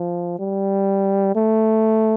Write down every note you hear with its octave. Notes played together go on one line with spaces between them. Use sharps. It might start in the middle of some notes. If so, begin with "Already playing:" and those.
Already playing: F3
G3
A3